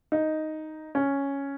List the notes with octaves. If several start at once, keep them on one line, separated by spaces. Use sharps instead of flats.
D#4
C#4